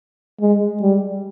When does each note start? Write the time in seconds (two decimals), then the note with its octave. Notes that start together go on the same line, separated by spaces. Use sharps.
0.41 G#3
0.81 G3